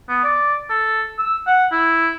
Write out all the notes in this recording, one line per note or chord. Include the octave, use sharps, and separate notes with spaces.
B3
D5
A4
E6
F#5
E4